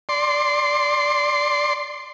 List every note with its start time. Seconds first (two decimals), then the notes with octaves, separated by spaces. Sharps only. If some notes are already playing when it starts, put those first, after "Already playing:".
0.09 D5 C6